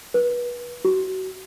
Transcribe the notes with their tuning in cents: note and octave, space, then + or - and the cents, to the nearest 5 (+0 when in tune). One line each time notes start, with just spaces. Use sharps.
B4 -30
F#4 +30